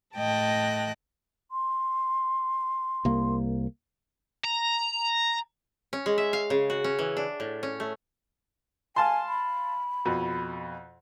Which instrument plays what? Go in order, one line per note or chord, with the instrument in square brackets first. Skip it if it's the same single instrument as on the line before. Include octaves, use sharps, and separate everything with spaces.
[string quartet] A2 D#5 G5 A5 F#6 A#6
[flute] C6
[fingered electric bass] C2 A#3
[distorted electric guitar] A#5
[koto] C#4
G#3
E5
F5
C#3
F#4
C#4
E3
D4
A2
C#4
A3
[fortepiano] F5 A5 C6 [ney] G#5
[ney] B5
[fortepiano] F2 B2